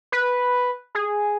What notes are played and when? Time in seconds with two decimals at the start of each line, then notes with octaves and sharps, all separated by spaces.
0.12 B4
0.95 G#4